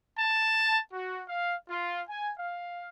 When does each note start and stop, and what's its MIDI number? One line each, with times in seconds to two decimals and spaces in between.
0.19 0.78 81
0.92 1.23 66
1.27 1.54 77
1.69 2.00 65
2.08 2.31 80
2.38 2.89 77